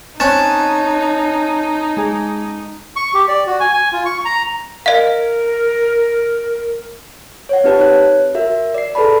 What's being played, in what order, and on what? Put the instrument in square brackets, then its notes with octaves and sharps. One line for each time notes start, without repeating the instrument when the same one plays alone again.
[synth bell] C4 F#6 [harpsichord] C#4 [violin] D#4 [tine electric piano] A5
[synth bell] G#3 G#4
[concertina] C#6
G4
D5
F#4
G#5
G#5
F4
C#6
A#5
[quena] A#4 [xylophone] D#5 F5
[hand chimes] C#5 F#5
C4 D#4 F#4 G4 B4 A5
C#5 F#6
F#4 A#4 E5
D5 C7
G#4 A4 B4 D5 A5 B5